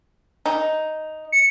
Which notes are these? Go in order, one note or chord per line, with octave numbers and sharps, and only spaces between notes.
D#4
C#7